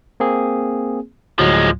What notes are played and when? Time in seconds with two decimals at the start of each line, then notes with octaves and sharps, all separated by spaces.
0.20 A#3 C4 G#4
1.39 D2 A2 F3 F#3 G#3